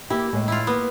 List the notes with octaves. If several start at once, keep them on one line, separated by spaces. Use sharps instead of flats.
A#3 E4 G4
A2 G#3
E4 F4
A#3 B3